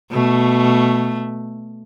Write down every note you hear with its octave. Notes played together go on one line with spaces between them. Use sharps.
B2 A3